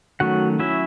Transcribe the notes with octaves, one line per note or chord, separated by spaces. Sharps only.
D#3 F#3 A3 C#4 F#4 F#5
F#3 C#4 E4 E5